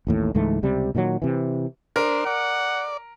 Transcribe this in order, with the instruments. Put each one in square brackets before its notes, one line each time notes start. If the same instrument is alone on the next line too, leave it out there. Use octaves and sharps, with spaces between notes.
[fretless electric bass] A1 D#2 A2
C#2 G#2 E3 A3
C#2 C3 G3
A#2 D#3 F3 F#3
C3 E3
[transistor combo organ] D4 C5 [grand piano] A#4
[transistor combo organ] D5 [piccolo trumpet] F#5